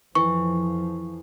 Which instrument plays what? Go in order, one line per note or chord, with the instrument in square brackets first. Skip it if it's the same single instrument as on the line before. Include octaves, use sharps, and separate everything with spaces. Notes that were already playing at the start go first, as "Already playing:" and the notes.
[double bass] F2 F3 [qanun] E3 [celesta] C#6